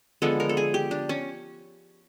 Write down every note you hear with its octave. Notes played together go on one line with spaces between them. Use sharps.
D3 F3 G#3 B3 A4
A#4
A4
G#4
G4
D4
C#4